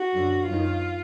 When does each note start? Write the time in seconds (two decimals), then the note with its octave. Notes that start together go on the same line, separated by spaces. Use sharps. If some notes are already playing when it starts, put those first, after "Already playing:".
Already playing: F#4
0.13 F#2 D3
0.47 F#2 D#3 F4